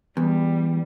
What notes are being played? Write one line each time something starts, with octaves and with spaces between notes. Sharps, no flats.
E2 G3